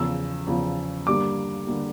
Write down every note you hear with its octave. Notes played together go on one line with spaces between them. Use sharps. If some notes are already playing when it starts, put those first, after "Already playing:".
Already playing: E2 C#3 F3 E6
E2 C#3 F3
G2 D3 G3 A#3 D6
D3 G3 A#3